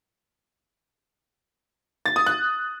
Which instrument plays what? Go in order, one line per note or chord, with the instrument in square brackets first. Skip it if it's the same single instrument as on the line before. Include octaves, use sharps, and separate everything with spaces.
[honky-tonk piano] A6
D#6
F#6